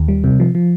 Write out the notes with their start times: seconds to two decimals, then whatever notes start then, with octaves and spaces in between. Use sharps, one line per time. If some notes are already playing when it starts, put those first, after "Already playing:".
Already playing: D#2
0.08 G3
0.24 C3
0.40 F3
0.55 F3